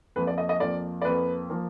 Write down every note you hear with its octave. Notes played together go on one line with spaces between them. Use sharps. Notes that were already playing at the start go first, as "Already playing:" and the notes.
F2 F3 A#3 B4
D5
D#5
D#5
F2 F3 A#3 D5
D5
F2 F3 A#3 B4
F3 A#3